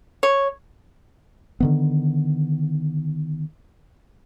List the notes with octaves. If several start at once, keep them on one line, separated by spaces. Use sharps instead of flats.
C#5
D3 D#3 B3